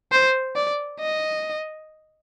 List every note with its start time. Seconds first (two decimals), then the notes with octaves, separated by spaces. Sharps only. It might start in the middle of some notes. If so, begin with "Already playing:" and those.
0.12 C5
0.56 D5
1.00 D#5